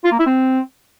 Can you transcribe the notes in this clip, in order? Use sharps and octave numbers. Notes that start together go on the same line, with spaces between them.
F4
A#3
E4
C4